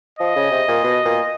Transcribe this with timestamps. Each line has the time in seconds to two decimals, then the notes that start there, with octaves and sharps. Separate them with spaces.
0.19 F3 D#5
0.36 C#3
0.51 C3
0.68 A#2
0.84 B2
1.05 A#2